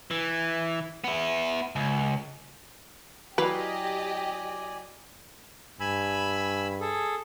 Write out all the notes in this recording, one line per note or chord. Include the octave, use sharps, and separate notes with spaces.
E3
B3 E4
C#2
F#3 E4 G4 B4 D5 D#5 F5 G#5
G2 G#5 B5 E6
G#4 A4